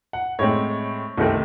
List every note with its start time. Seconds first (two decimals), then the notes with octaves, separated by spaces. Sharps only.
0.13 F#5
0.39 A2 G#3 C4 C#5
1.17 C2 C3 D#3 A3 C4